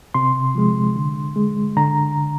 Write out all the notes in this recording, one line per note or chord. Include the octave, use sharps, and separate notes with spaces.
C3 C6
F3 G#3
D3
G#3
D3 A#5